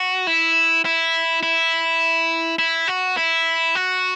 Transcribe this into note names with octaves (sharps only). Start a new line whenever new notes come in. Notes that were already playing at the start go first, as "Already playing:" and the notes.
Already playing: F#4
E4
E4
E4
E4
F#4
E4
F#4